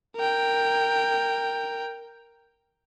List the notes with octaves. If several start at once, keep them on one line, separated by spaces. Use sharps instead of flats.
A#4 G5